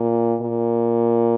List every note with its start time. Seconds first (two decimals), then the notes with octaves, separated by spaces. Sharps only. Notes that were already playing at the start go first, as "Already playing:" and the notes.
Already playing: A#2
0.41 A#2